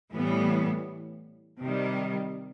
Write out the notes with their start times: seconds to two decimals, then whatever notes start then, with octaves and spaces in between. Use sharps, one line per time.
0.13 A2 E3 G3 B3
1.62 C3 D#3 G3